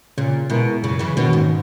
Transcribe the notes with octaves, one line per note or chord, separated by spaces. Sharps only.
A#2 C#3
B2 G#3 B3 E4 A#4
F#2 C#3
C#3 E3
B2 D#3 A#3 C#4 F#4
G#2